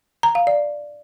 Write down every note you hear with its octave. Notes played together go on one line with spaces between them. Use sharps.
A#5
F5
D5